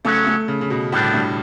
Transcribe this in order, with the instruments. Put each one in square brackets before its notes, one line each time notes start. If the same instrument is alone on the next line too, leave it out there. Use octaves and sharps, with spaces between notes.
[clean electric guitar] C#3 F#3 C#4 F#4 [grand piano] A3
[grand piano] A3
C#3
C#3
B2
[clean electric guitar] D2 D3 G3 B3 D4 [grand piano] A2
[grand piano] G2